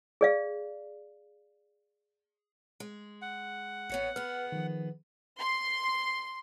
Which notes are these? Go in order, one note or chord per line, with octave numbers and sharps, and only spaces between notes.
G#4 D5 F5
G#3
F#5
A1 B3 C#5 D#5 C#7
B3 G#4 B4 F6
D#3 F3
C6